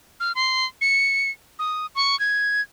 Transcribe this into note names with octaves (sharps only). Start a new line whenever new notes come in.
F6
C6
C#7
D#6
C#6
G#6